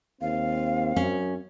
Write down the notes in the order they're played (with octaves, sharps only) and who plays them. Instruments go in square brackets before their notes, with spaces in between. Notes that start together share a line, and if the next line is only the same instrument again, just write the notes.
[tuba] D#2 [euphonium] C4 [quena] F5
[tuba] F#2 [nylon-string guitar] C#4